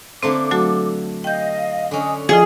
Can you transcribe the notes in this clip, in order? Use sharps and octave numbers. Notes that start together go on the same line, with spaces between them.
D3 A3 A#3 C4 C5 D6
F#3 A3 F#4 A4
D#5 F5 G5 G6
D3 C#4 D#5 G#5 D#6
F3 F4 G#4 D5 D#5